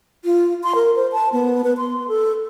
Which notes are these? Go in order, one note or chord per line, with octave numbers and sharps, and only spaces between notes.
F4
C6
A#4
C5
A5
B3
B4
C6
A4